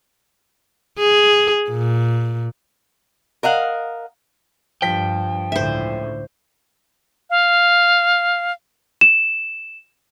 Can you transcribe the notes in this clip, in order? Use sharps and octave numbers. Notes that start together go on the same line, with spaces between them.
G#4
A#2
A#4 D#5 F5 F#5
G2 F3 G5 B6
C#2 A2 D3 C5 E5
F5
E7